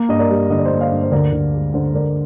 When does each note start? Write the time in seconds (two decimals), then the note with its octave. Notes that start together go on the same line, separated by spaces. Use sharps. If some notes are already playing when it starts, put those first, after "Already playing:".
Already playing: A#3
0.09 G2 D#5
0.19 A#4 D5
0.30 G3
0.50 D3 D#5
0.58 D5
0.66 C5 D#5
0.71 A#3
0.81 D5 F5
0.92 G2
1.03 C5
1.12 D2 A#4 D5
1.32 D2
1.53 G#3
1.74 D3 C5
1.94 D2 A#4 D5